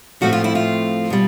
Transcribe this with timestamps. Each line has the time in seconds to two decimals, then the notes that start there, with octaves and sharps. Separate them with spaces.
0.21 A2 F3 A3 C4 F#4
0.33 F4
0.44 E4
0.55 F4
1.10 B2 G3